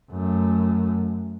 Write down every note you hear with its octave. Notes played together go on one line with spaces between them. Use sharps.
F#2 A3